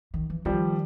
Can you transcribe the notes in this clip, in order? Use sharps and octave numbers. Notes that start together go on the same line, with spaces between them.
D#3
E3
D#3 F3 G3